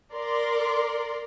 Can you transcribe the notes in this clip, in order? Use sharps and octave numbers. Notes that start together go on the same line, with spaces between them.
A#4 D5 C6